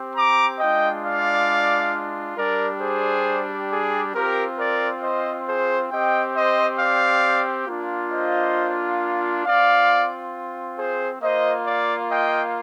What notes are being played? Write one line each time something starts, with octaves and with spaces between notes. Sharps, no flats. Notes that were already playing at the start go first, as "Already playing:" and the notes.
Already playing: C4 G4
A#5 D6
G#3 D4 F4 D#5 G5
D5 F5
G3 D4 G4 A#4 D5
G#4 C5
G#4
C4 F4 G4 A#4
A#4 D5
C5 D#5
G#4 C5
C4 G4 D#5 G5
C5 D#5
D5 F5
A#3 D4 F4
C5 D#5
C4 F4 D5 F5
G#4 C5
A#3 F4 C5 D#5
D5 F5
D#5 G5